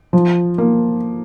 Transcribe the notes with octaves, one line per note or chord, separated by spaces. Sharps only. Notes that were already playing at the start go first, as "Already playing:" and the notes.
F3
A#3